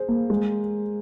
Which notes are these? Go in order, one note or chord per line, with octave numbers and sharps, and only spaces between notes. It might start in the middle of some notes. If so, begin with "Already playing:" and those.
Already playing: G#4 C5
A#3
G#3